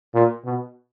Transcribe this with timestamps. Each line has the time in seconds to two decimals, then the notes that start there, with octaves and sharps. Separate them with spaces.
0.14 A#2
0.45 B2